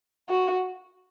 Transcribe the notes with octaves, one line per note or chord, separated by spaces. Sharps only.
F#4